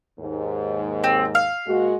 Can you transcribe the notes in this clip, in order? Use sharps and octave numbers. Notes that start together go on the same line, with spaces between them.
D#2 G#2
C4
F5
A#2 G#3 F#4